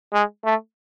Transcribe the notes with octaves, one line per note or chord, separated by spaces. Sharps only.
G#3
A3